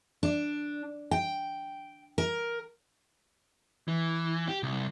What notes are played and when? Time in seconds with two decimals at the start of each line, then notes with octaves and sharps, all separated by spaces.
0.23 D4
1.11 G5
2.18 A#4
3.88 E3
4.48 G4
4.63 C2